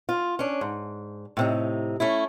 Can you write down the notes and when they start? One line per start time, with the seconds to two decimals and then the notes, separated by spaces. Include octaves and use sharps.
0.09 F4
0.39 C#4 D4
0.61 G#2
1.37 A2 C3 D#4
2.00 A3 C#4 E4